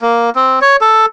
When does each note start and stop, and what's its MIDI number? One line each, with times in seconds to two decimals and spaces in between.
0.02 0.30 58
0.35 0.59 60
0.62 0.76 73
0.81 1.06 69